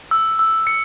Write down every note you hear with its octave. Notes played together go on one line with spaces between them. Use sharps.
E6
E6
C#7